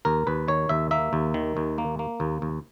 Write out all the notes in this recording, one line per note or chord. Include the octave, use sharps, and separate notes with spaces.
D#2 A#4
D#2 B4
D#3 C#5
D#2 E5
A#3 E5
D#2
D#3
D#2
A#3
A#3
D#2
D#2